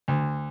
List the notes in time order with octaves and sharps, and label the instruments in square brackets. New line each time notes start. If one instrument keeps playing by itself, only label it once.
[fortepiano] D2